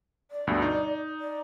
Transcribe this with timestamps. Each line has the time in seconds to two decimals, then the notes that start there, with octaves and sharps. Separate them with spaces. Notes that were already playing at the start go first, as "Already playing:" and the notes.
0.31 D5
0.47 D2 G2 B2
0.62 D#4
1.20 D5